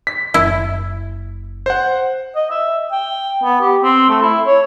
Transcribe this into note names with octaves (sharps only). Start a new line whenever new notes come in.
B6
F#1 E4
C5 F#5
D#5
E5
G5
B3
G4
C4
A3
E4
C#5